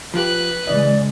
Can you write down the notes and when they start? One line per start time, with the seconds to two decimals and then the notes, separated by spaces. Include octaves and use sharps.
0.14 F3 F4 G4 B4 F#6
0.67 C#3 E3 G#3 D5 D#5